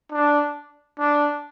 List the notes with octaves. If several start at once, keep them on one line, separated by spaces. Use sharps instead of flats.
D4
D4